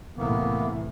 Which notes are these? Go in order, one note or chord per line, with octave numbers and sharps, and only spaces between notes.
C2 A2 E3 A#3 B3